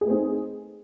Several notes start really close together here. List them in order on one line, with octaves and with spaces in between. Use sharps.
G#4 A3 B4 C4 D#4